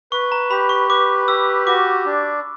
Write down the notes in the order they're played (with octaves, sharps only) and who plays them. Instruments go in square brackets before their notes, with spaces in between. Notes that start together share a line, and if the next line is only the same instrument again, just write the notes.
[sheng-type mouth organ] B4 [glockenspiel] C#6
[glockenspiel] A#5
[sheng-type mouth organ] G4 [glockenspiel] B5
[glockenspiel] C#6
[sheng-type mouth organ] B4 [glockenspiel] D6
[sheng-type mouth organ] G4 [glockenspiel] E6
[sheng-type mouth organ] F#4 [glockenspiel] D6
[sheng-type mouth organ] D4